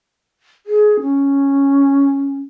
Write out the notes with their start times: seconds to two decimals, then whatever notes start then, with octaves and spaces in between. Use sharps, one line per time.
0.66 G#4
1.01 C#4